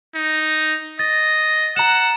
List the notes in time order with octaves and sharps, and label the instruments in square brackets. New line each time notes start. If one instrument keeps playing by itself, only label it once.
[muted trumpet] D#4
[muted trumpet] D#5 [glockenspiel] A6
[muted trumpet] F#5 [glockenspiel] A#5 E7